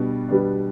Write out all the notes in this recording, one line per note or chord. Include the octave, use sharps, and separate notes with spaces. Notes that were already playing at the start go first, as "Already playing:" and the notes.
Already playing: B2 G3 B3 D4
B2 G3 B3 D4